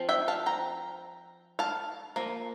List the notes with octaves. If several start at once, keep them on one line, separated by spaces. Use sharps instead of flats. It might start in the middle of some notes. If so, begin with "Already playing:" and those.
Already playing: F3 C4
E5 G5
F5 A5
G5 A#5
F5 A5
F3 A#3